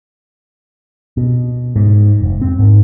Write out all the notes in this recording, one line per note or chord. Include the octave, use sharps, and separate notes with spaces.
B2
G#2
F1
C4
G#2